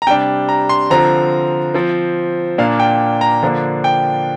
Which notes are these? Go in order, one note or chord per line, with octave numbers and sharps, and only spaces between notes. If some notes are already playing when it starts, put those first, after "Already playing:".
A#5
C3 G3 D4 G5
A#5
C6
D3 F3 C4 A#5
F3 C4
A#2 A#3 D4 F5
G5
A#5
D3 F3 A#3 D4
G5